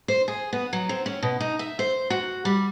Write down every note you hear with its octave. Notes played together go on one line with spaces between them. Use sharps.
C5
G#4
B3
F#3
C4
C#4
B2
D#4
E5
C5
F#4
G3